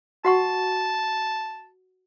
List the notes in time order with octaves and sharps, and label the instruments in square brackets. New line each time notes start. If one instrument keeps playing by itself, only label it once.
[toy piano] F#4 F#5 C#6 [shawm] A5